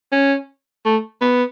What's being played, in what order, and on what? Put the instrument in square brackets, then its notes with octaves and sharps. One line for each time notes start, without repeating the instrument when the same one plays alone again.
[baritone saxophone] C#4
A3
B3